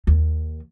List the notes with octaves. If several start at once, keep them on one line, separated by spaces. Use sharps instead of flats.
D#2